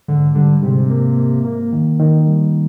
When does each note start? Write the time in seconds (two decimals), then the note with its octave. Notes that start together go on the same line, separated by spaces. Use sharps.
0.08 G#2 D3
0.35 D3 G3
0.63 G#2 C3
0.90 A#3
1.17 A#3
1.45 A#3
1.73 D#3
2.00 D#3
2.26 G3